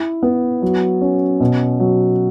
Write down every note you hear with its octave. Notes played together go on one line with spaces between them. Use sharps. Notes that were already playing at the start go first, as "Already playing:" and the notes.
Already playing: E4
B3
F#3
C#4
B2
F#3